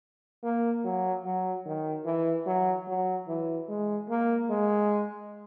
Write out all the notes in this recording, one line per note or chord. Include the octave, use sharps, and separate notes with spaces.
A#3
F#3
F#3
D#3
E3
F#3
F#3
E3
G#3
A#3
G#3